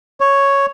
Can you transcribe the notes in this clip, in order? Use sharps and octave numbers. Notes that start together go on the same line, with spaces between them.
C#5